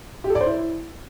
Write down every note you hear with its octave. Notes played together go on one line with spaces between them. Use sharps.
G4
A4
D5
C5
E4